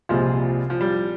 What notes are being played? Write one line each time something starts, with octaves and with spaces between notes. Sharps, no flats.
C2 A#2 F3 G3 G#3 C4 F4
F3
G3